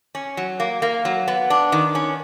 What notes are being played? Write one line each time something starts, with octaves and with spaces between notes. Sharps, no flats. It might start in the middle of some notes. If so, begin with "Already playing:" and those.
C#4
F#3
A#3
A#3
F#3
B3
D4
D#3
C#4